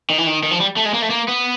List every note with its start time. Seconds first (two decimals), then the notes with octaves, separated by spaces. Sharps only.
0.10 D#3
0.18 E3
0.27 D#3
0.43 D#3
0.51 F3
0.60 G3
0.77 A3
0.86 G#3
0.94 A#3
1.02 A3
1.10 A#3
1.28 B3